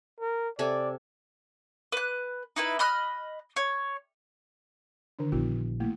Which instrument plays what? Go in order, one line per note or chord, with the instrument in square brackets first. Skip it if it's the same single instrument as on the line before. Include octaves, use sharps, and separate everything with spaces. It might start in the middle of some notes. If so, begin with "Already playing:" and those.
[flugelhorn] A#4
[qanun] C3 A4 G#5 [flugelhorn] D5
[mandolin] B4 F#6
D#4 E4 B4
D#5 B5 F6 F#6
C#5
[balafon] D3 D#3 D4
[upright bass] A#1 [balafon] B3 E4 F#4
[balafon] A3 A#3 E4